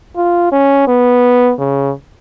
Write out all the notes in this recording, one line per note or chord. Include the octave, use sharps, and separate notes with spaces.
F4
C#4
B3
C#3